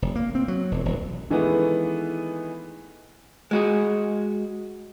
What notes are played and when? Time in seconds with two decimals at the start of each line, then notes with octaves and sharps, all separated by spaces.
0.02 F1
0.15 A#3
0.35 C4
0.48 F#3
0.72 E1
0.85 D#1
1.30 D#3 E3 G#3 A3 B3
3.51 G#3 F#4 G#4